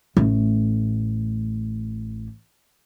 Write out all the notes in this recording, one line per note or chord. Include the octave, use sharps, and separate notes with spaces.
A1 A3